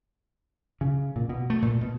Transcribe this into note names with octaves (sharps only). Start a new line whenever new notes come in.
C#3
A#2
B2
A3
A#2
B2